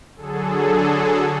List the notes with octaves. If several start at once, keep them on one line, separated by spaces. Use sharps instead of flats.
D3 F#3 G#4 A4